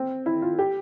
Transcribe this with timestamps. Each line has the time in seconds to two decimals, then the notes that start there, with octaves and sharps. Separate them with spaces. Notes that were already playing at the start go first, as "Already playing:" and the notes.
Already playing: C4
0.26 E4
0.42 F4
0.59 G4